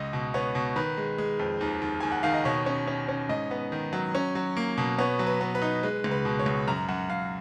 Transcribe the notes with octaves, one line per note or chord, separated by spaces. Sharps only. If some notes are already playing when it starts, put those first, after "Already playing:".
Already playing: C#2 D#5
B2
B3 C#5
B2
D#3 B4
G#3
G#3
F2
D#2
D#2
D#2 G#5
F#5
D#3 F5
D#5
B2 C#5
C#4
C#4
C#4
G#2 D#5
B3
D#3
F#3
C#4
F#3
A#3
B2
B3 C#5
F#3
B4
B3
B4
D#4
G#3 B4
C#2
B4
B2
C#5
C#2
F#2 A#5
F#2 F#5
F#2 F5